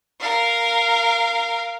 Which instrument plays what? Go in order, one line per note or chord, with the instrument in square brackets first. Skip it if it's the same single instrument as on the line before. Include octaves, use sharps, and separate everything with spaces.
[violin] A#4 F5